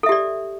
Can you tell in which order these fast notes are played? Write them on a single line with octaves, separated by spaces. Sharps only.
A4 E5 G4 D5